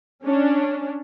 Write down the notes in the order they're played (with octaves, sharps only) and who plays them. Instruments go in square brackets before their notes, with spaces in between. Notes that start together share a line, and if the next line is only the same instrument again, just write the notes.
[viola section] C#4 D4